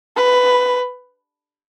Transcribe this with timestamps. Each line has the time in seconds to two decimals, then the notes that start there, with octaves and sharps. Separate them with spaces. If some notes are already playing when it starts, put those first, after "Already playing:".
0.17 B4